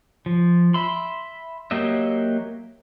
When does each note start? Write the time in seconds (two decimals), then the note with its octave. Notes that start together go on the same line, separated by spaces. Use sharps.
0.26 F3
0.74 E5 B5 C6
1.71 F#3 A#3 G4 D#5 E5